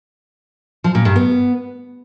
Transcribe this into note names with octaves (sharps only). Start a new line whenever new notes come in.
F3
A#2
G2
B3